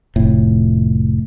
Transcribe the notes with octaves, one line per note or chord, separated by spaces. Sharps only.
F1 A2